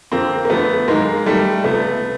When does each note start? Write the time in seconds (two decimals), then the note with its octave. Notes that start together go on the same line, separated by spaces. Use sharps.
0.12 F2 D3 F3 A#3 C4
0.45 A#3
0.50 F2 D3 F3 A3 B3
0.88 G#2 D#3 F#3 G#3 A#3
1.26 G#2 D#3 F#3 G3 A3
1.64 C#2 C3 F3 A3 B3